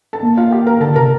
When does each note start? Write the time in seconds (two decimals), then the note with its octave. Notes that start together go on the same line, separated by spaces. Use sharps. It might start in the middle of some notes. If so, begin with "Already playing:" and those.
0.13 A4 A5
0.22 A#3
0.37 F4 F5
0.51 G4 G5
0.67 A#4 A#5
0.80 D3 A4 A5
0.96 C3 A#4 A#5